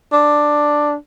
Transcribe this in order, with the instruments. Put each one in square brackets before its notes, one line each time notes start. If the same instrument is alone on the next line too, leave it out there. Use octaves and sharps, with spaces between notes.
[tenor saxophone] D4